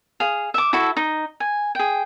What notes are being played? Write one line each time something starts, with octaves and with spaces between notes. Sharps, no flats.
G#4 F5
E5 D6
E4 F#4 A4 E5
D#4
G#5
G#4 G5